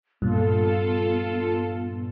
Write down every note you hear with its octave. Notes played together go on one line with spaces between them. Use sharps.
G2 A#2 B3 F4 A4